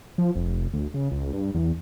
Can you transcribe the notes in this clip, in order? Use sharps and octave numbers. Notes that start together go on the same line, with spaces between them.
F3
F1
D2
C#3
C#2
G2
E2